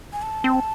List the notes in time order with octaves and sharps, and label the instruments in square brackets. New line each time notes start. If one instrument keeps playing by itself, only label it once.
[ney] G#5
A5
[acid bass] C4